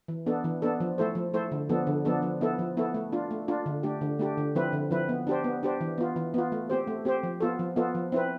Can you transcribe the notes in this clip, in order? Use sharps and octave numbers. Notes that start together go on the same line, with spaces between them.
E3
B3 D4 A4
E3
B3 D4 A4
F3
A3 E4 A4 C5
F3
A3 E4 A4 C5
D3
F3 B3 D4 A4
D3
F3 B3 D4 A4
F3
B3 E4 A4
F3
B3 E4 A4
A3
D4 F4
A3
D4 F4
D3
A3 D4 G4
D3
A3 D4 G4
D3
F3 C4 E4 B4
D3
F3 C4 E4 B4
B3
D4 G4 C5
B3
D4 G4 C5
E3
B3 F4
E3
B3 F4
A3
C4 G4 C5
A3
C4 G4 C5
F3
B3 F4 A4
F3
B3 F4 A4
F3
C4 E4 B4